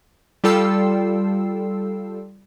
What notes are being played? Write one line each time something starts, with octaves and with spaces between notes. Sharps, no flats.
G3 F4 A4 G5 E6 C7